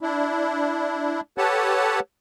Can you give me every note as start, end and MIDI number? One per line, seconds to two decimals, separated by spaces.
0.01 1.20 62
0.01 1.20 64
1.38 2.00 67
1.38 2.00 69
1.38 2.00 71
1.38 2.00 73
1.38 2.00 78
1.38 2.00 81